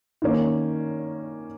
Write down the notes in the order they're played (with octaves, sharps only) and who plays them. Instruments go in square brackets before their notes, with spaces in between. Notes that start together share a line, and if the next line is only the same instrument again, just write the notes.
[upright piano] D#3 A#3 C#4